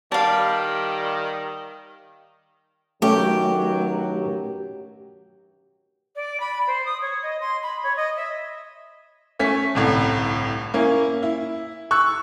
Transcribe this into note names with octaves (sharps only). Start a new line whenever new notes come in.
D#3 G3 F5 A5
G2 D#3 F#3 A3 C#4 G4
D5
B5
C5
D#6
C#5
D#5
C6
B5
C#5
D#5
E5
A3 C#4 B6
G1 C2 A2
A#3 C#4 E4
E4
C#6 E6 F#6